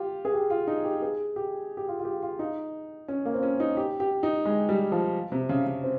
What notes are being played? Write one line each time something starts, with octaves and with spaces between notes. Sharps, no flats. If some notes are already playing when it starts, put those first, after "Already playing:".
Already playing: F4 G4
G#4
G4
F4
D#4
G4
G#4
G4
G4
F4
F4
G4
F4
D#4
C#4
A#3
C4
C#4
D#4
G4
G4
D#4
G#3
G3
F3
C3
C#3
C#3
C4